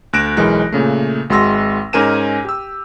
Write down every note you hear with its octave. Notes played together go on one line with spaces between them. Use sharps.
D2 F#6 A#6 D7 E7
B1 E3 G#3 A#4 A#6
A#2 C#3 A3
G#1 G#3 F#4 C6 E6 A#6
G#2 C#4 A#4 G#5 D#7 E7
G4 E6